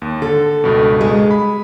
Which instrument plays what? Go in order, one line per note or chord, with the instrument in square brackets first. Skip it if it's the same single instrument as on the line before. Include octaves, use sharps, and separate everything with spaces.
[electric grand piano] D#2
[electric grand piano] D3 [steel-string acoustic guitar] A4
[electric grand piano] C#2 G2 B2
[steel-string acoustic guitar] G#3
[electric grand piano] B5